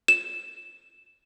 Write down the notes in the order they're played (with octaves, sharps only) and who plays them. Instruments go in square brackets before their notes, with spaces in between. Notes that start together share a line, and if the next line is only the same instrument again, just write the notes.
[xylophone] E7